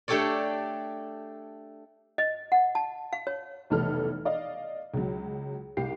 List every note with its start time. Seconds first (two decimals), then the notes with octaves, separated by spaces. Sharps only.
0.08 A3 D4 G4 A4 C#5 D5
2.18 D#5
2.52 F#5
2.75 A5
3.13 F5
3.27 C#5
3.70 F1 B1 E3 A4 F6
4.25 D5 D#5 F5
4.94 C#2 F#3
5.77 C2 G4 C7